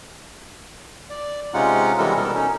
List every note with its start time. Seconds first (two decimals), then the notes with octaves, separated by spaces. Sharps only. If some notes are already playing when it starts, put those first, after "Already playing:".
1.10 D5
1.54 C3 G#3 C#4 D#4 F4 F#5
1.98 C3 E3 G3 G#3 A4 A#4
2.17 B2 G3 B3 D#4 A4 A#4
2.35 C#4 D#4